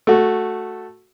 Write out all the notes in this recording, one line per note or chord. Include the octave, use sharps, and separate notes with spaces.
A3 F#4